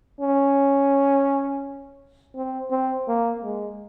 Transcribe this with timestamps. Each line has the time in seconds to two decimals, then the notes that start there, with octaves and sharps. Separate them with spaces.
0.21 C#4
2.35 C4
2.71 C4
3.08 A#3
3.43 G#3